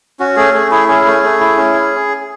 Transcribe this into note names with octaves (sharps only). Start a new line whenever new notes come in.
C#4 F#4
A3 G#4
A3 G#4
E4 G#4
C#4 G#4
A3
A3
E4
C#4